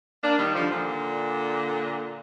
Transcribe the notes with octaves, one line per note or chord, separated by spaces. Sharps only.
A#3 D4
D#3 G3
D3 F3
A#2 D3